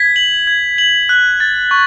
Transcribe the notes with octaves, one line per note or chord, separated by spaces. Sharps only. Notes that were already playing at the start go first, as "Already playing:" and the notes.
Already playing: G#6 B6
F#7
G#6
F#7
F#6
A6
C#6